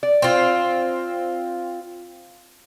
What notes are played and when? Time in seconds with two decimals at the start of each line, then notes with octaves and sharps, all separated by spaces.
0.03 D5
0.22 C4 F4